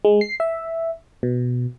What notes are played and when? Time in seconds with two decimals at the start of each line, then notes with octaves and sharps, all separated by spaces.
0.05 G#3
0.21 C7
0.40 E5
1.23 B2